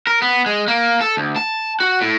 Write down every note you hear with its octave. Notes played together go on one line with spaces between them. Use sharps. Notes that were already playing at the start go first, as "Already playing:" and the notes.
A#4
B3
G#3
A#3
A4
D2
A5
F#4
A2